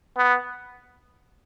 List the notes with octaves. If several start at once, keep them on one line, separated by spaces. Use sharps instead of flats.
B3